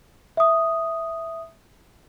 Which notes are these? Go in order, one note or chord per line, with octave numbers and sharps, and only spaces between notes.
E5 D#6